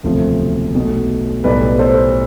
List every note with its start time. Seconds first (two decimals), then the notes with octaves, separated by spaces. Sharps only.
0.03 E1 D2 C3 F3 A3
0.74 B1 B2 A3
1.44 B1 A2 G3 B4 D5
1.79 A4 C5